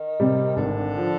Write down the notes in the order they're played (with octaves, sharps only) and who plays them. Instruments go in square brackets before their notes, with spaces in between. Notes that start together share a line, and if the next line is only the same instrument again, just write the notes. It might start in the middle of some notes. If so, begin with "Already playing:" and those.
Already playing: [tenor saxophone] D#3
[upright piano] C3 G3
[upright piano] G#1 [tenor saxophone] D3
[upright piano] F3